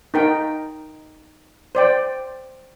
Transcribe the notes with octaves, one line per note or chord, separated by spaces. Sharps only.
D#4 A#4 G5
C5 D5 G5